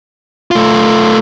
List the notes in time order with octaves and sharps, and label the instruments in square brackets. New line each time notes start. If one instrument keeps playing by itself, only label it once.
[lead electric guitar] A3 F4